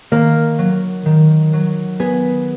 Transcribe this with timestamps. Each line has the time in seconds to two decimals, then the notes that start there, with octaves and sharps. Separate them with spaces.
0.11 D#3 A#3
0.58 F#3
1.06 D#3
1.53 F#3
1.99 B3 G#4